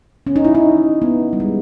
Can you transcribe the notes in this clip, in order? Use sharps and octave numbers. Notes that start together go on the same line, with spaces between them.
C#4
D#4
E4
D#4
B3
G3
G#3